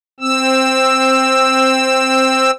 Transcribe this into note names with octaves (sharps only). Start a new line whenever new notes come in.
C4 E6